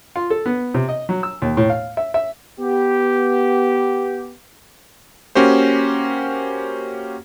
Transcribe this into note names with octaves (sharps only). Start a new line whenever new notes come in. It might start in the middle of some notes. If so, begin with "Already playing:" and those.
F4
A4
B3
C3
D#5
F#3
E6
D#2
A2
F5
E5
E5
B3 G4
A#3 C#4 F#4 G4 C5